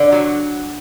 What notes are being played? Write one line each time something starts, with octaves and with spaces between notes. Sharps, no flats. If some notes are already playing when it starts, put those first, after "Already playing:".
Already playing: D3
F#3